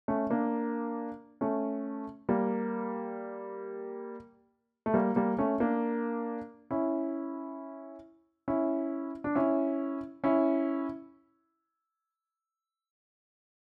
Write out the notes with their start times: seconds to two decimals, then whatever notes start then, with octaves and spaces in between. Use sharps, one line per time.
0.08 A3 C#4
0.30 A#3 D4
1.41 A3 C#4
2.29 G3 A#3
4.86 A3
4.94 G3 A#3
5.16 G3 A#3
5.38 A3 C#4
5.60 A#3 D4
6.71 C#4 E4
8.48 C#4 E4
9.24 D4
9.35 C#4 E4
10.24 C#4 E4